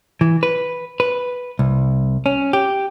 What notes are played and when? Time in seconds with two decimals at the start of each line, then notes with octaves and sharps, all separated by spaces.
0.21 E3
0.43 B4
1.00 B4
1.59 C2
2.26 C#4
2.53 G4